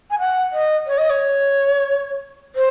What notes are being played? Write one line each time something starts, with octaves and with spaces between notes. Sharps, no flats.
G#5
F#5
D#5
C#5
D#5
C#5
C5